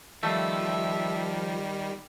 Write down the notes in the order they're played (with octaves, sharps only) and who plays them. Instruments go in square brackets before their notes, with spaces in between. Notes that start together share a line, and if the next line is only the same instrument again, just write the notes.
[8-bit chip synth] D#3 G3 [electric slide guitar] F3 [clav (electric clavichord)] A3 [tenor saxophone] E5